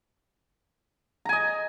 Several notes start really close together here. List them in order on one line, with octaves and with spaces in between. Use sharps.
A#5 G#5 D#5